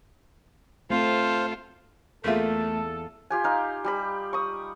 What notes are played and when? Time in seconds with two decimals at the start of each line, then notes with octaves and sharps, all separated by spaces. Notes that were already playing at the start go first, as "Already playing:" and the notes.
0.90 A3 C4 F4 A4 C5 F5
2.24 E2 A3 A#3 F4 G#4 A4 E5
3.30 F4 G4 G#5
3.44 D#4 F5
3.84 G3 G4 B5
4.33 C#6 D#6